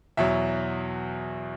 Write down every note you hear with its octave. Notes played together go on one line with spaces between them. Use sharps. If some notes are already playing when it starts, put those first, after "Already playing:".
E2 B2 F#3 E5